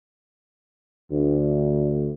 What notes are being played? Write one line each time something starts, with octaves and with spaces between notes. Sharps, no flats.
D2